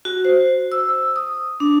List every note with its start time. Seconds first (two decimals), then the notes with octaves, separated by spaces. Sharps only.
0.05 F#4
0.25 C5
0.72 E6
1.16 D#6
1.60 D4